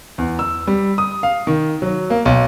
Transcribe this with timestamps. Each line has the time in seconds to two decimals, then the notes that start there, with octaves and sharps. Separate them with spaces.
0.18 E2
0.39 E6
0.67 G3
0.98 D#6
1.23 F5
1.47 D#3
1.82 F#3
2.10 A#3
2.25 B1